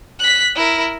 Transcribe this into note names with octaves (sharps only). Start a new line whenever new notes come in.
F#6 B6
E4 A#4